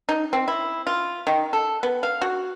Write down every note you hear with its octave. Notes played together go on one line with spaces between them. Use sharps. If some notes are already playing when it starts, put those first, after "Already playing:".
D#4
C4
E4
F4
D#3
A4
B3
F5
F#4